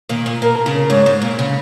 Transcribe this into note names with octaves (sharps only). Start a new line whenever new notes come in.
A#2 D#3
A#2
A#2 A#4
C#3
G#2 C#5
G#2
A#2
C#3